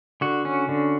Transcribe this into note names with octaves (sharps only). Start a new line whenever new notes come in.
D3 F#4
C#4
D3